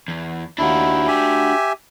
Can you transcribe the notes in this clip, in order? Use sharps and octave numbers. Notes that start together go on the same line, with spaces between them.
E2
D#2 D4 E4 F#4
G4 E5 G#5